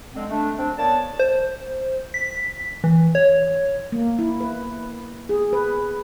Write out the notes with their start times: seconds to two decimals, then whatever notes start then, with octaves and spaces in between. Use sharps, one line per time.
0.15 D3 G#3 C4
0.30 A3 D4
0.57 C4 D4
0.78 A#3 B3 C#5 D5 A5
1.19 C5
2.14 B6
2.84 E3
3.15 C#5
3.92 A#3
4.19 E4
4.40 B4
5.29 G#4
5.53 B4